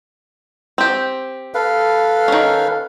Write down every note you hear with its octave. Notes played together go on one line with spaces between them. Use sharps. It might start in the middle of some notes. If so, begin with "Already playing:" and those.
C4 G4
A4 B4 F5
D#3 C#4